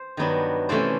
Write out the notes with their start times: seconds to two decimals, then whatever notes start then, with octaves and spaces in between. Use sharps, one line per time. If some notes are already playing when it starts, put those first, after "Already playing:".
Already playing: C5
0.17 G2 D#3 F#3 B3 D4
0.69 C3 E3 A3 C#4 C5 D5